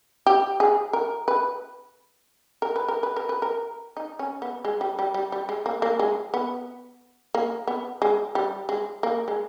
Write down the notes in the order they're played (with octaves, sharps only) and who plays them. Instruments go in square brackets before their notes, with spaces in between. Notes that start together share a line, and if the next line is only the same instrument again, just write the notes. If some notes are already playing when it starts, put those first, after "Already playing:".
[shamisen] G4
G#4
A#4
B4
A#4
B4
A#4
B4
A#4
B4
A#4
D#4
C#4
B3
G#3
G3
G3
G3
G3
G#3
A#3
A#3
G#3
B3
A#3
B3
G#3
G3
G#3
A#3
G#3